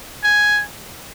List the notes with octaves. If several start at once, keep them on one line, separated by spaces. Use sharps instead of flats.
G#5